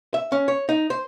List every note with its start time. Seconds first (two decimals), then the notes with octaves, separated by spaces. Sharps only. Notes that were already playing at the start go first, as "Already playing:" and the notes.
0.14 E5
0.32 C#4
0.48 C#5
0.69 D#4
0.90 C5